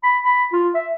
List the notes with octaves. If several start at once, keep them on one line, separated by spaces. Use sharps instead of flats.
B5
B5
F4
E5